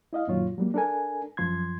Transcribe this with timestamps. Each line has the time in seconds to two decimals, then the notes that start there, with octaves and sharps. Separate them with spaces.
0.13 E4 D#5 F5
0.27 F#2 A#2 D#3 F#3 F4 C#5
0.58 F#3 G3 A#3
0.74 D4 A4 A#4 G#5
1.37 F#2 F3 C6 G#6